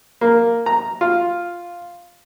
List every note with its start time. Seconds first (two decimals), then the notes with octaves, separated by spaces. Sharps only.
0.21 A#3
0.66 A#5
1.01 F4